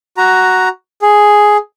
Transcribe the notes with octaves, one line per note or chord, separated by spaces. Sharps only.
F#4 A#5
G#4